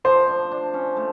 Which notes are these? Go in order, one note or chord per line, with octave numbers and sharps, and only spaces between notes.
F3 C5
D4
D4
C#4
A3